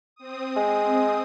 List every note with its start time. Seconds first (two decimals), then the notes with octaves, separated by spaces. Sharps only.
0.16 C4 D#6
0.56 G#3